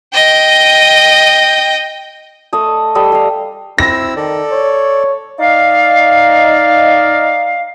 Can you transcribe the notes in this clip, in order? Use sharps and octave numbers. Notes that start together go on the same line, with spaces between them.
D#5 G5
A3 D#5 A5
G3 A4 D#5 E5
G3 F5
C4 E4 E6 A#6
D#3 A4 D5
C#5
D#4 D5 D#5 F5